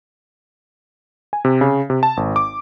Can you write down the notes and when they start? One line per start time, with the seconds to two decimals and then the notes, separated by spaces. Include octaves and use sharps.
1.33 G#5
1.45 C3
1.61 C#3
1.90 C3
2.03 A5
2.17 G#1
2.36 D6